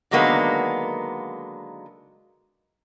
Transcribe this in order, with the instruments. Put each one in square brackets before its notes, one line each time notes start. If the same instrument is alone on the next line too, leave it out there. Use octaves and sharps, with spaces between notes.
[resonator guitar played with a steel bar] D3 D#3 F#3 G#3 A#3 B3